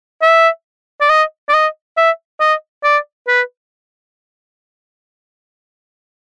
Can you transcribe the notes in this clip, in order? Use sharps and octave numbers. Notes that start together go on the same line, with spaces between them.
E5
D5
D#5
D5
D#5
E5
D#5
D5
B4